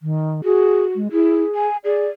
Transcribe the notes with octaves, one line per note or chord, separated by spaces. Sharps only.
D#3
F#4 G#4
G#3
E4 G#4
G#5
G#4 D5